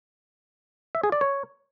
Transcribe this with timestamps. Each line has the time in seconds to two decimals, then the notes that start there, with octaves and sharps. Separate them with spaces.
0.95 E5
1.04 G#4
1.12 D5
1.21 C#5